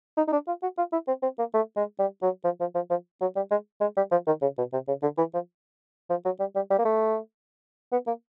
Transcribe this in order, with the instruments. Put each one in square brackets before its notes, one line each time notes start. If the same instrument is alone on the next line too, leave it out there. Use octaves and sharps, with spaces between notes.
[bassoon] D#4
D#4
D4
F4
F#4
F4
E4
C4
C4
A#3
A3
G#3
G3
F#3
F3
F3
F3
F3
F#3
G3
G#3
G#3
G3
F3
D#3
C#3
B2
C3
C#3
D3
E3
F3
F3
F#3
G3
G3
G3
A#3
A3
B3
A#3